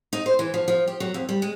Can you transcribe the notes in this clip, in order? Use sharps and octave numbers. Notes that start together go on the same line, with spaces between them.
D#4
C5
E3
F3
F3
G4
F#3
F2
G3
G#3